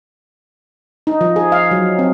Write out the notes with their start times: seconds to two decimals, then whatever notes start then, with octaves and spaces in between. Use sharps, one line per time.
1.07 D#4
1.21 F3
1.36 G#4
1.52 F5
1.71 F#3
1.99 C4